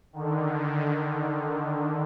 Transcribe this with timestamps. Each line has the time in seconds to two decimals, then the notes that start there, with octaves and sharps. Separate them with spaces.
0.13 D3 D#3